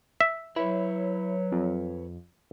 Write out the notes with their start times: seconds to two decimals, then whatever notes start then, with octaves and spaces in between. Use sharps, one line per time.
0.20 E5
0.56 F#3 E4 B4 C#5
1.52 F2